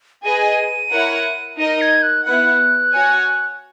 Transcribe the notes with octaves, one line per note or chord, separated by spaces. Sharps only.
G#4 B4 D#5 G#5 D#7
E4 A#4 C#5 F#5
D#4 A#4 D#5 D#7
G#6
F#6
B3 E4 B4 F#5 F#6
F#4 C#5 G#5